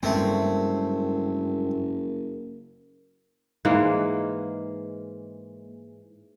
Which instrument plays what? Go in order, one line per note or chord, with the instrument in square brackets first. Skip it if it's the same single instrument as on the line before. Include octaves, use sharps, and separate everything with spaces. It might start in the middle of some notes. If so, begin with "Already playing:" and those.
[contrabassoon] F#1 [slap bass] G2 G#3 [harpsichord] A3 C4 [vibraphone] A#4
[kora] G#2 E3 G#3 A#3